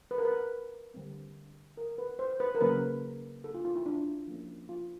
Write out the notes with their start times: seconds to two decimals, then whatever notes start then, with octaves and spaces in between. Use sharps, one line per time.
0.11 B4
0.18 A#4
0.25 B4
0.94 D3 G3 C4
1.77 A#4
1.98 B4
2.19 C5
2.40 B4
2.55 A#4
2.61 C#3 F#3 A#3 C#4 B4
3.44 A4
3.54 F4
3.65 F4
3.76 E4
3.86 D4
4.28 F3 A#3 C#4
4.69 F4